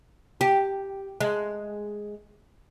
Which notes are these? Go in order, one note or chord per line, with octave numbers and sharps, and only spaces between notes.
G4
G#3